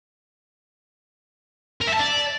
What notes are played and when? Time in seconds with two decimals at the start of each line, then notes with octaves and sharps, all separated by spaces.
1.81 A#4
1.87 E5
1.94 A5
2.00 D5